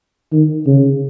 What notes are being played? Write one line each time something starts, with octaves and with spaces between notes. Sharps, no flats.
D#3
C#3